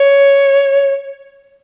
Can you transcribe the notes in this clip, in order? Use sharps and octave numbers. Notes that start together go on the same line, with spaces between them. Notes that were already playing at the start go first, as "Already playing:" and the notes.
Already playing: C#5